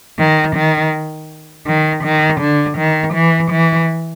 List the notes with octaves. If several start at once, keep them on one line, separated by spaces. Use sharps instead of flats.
D#3
D#3
D#3
D#3
D3
D#3
E3
E3